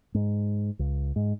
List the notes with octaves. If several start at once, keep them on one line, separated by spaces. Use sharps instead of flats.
G#2
C#2
G#2